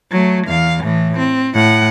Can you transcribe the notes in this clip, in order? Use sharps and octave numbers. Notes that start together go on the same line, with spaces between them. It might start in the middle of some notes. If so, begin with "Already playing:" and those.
F#3 A3
E2 F5
A2 E3
C4
A2 F#5